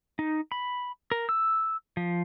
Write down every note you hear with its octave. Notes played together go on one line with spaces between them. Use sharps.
D#4
B5
A#4
E6
F3